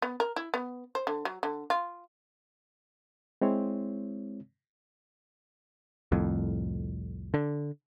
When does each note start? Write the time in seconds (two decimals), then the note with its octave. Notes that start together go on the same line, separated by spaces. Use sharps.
0.02 B3
0.20 A#4
0.36 E4
0.54 B3
0.95 C5
1.07 D3
1.25 F#3
1.43 D3
1.70 F4
3.41 G#3 C4 E4 C#5
6.12 C2 F2 A2
7.34 D3